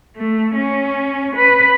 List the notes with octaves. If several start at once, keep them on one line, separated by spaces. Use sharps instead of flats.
A3
C#4
B4